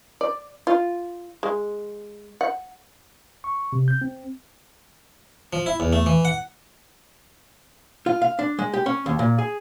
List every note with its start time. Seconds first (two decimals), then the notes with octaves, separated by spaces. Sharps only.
0.21 D5
0.67 F4
1.43 G#3
2.41 F#5
3.44 C#6
3.73 C3
3.88 G6
4.01 C4
5.53 F3
5.66 E4
5.80 E2
5.93 A3
6.06 E3
6.25 F#5
8.06 F4
8.21 F5
8.39 D4
8.59 G#3
8.74 G4
8.86 C#4
9.06 D#2
9.19 A#2
9.38 G#4